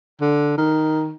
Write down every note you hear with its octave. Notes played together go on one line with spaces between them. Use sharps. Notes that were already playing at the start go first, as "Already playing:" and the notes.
D3
D#3